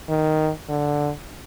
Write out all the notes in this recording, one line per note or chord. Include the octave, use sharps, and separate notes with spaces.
D#3
D3